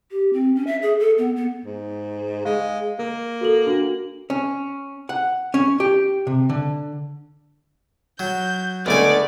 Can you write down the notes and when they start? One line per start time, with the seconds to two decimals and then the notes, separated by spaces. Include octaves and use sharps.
0.11 G4
0.33 C4
0.55 C#4
0.67 E5
0.82 G#4
1.00 A4
1.18 B3
1.36 B3
1.66 G#2
2.45 G#3 F5
2.99 A#3 A#4
3.41 F#4 A4 F#7
3.66 D4 F#4 F#7
4.30 C#4
5.09 F#5
5.54 C#4
5.80 G4
6.27 C3
6.50 D3
8.19 F#3 G6
8.86 C#2 D3 A3 B3 D5 G#5 D7